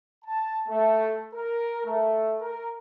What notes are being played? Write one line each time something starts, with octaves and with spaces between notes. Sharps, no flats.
A5
A3
A#4
A3
A#4